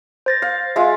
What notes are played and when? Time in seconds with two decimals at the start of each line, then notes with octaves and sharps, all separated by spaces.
0.26 C5 A6 A#6
0.42 F5
0.76 G#3 F4 E5